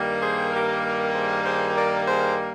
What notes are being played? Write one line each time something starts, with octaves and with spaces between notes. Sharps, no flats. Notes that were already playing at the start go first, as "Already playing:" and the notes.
Already playing: G2 D#3 G3 A#3
G#4 C5
G4 A#4
G4 A#4
G#4 C5
G#4 C5
A#4 D5
G#4 C5